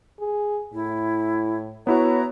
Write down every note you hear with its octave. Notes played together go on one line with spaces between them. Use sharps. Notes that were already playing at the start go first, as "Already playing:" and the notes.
G#4
A2 E4
B3 E4 F#4 C#5 A#5